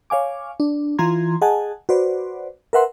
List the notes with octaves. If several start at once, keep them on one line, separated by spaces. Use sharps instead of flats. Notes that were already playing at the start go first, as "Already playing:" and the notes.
C#5 F5 G#5 D6
D4
E3 F4 A#5 C6 G#6
G#4 D#5 F#5 G#5 A5
F#4 B4 C5 D5
A#4 B4 E5 F#5 C6